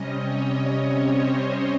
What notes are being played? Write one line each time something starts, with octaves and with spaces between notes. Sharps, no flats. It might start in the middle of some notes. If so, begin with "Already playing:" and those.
Already playing: C3 G3 C#4 D#5
C#5
C5